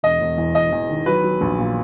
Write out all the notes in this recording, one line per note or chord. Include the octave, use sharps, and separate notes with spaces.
E1 D#5
E1
E2
E1 D#5
E2
D#3
F#3 B4
F#3
A#1
A#2